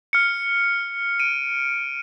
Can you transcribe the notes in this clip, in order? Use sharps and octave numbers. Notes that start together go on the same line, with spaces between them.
F6 C#7
D7 D#7